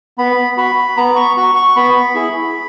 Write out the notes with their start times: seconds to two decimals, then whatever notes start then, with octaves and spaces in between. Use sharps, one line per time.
0.18 B3 B5
0.57 F#4 B5
0.97 B3 A#5
1.16 C#6
1.37 F#4 C#6
1.55 C#6
1.76 B3 B5
2.15 E4 G#4